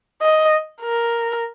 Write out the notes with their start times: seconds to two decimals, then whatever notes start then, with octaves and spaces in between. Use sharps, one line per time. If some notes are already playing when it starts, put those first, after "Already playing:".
0.22 D#5
0.82 A#4